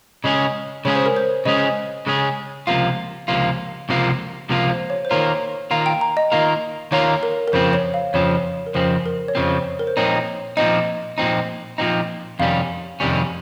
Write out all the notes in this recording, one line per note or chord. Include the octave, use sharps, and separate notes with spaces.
C#3 G#3 C#4 G#4 D#5
C#3 G#3 C#4 G#4 C#5
C5
A#4
C5
C#3 G#3 C#4 G#4 D#5
C#3 G#3 C#4 G#4
C#2 C3 F3 A#3 F4 F5
C#2 C3 F3 A#3 F4
C#2 C3 F3 A#3 F4
C#2 C3 F3 A#3 F4
C5
C#5
C5
D#3 A#3 F4 A#4 C#5
D#3 A#3 F4 A#4 F5
G5
A#5
D#5
D#3 A#3 F4 A#4
D#3 A#3 F4 A#4 C#5
A#4
A#4
F2 C#3 F3 C4 C5
C#5
F5
F2 C#3 F3 C4 C#5
A#4
F2 C#3 F3 C4 C5
A#4
C#5
F2 C#3 F3 C4 C5
A#4
C5
A#2 F3 C4 D#4 C#5
A#2 F3 C4 D#4 D#5
A#2 F3 C4 D#4
A#2 F3 C4 D#4
F2 C3 D#3 G3 C#4 F5
F2 C3 D#3 G3 C#4